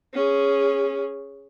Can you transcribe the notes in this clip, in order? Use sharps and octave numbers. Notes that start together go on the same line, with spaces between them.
C#4 G#4